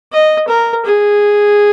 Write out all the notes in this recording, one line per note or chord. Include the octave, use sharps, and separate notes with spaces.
D#5
A#4
G#4